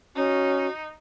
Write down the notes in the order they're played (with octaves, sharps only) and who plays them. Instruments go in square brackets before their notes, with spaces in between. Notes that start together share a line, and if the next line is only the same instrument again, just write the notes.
[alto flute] C#4 [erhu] D#4 [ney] F#4